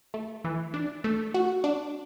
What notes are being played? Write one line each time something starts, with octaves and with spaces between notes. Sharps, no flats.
A3
E3
D4
A3
F#4
D4